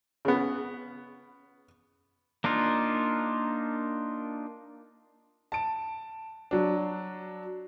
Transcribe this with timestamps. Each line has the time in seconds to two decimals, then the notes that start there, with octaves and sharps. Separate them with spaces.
0.25 C#3 B3
2.44 A#3 D4 D#4 F4
5.52 A5 D7
6.51 F#3 D4